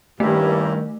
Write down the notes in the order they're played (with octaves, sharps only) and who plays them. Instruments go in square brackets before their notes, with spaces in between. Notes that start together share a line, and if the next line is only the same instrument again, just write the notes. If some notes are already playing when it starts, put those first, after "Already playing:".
[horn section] G2 [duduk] D#3 [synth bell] A3 [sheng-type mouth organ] A#3 C#4 E4